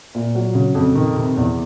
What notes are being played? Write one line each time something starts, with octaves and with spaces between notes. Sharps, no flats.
A#2
F#3
C#3
F2
D#3
C3
E2